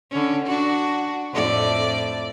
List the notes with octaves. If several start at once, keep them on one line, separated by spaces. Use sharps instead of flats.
D3 C#4
D4 F#4
F2 A2 D5